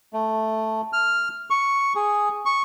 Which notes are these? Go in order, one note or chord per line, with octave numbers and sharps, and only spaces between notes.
A3
F6
C#6
G#4
C#6